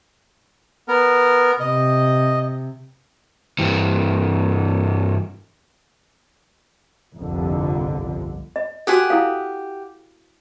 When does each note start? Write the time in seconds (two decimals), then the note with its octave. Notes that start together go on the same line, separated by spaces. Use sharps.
0.88 B3 A#4
1.60 C3 D#5
3.59 G2 E3
7.16 G1 C2 F2 D3
8.56 D#5
8.87 F#4 G4 A4 F#5 G#5
9.10 E4 A4 F5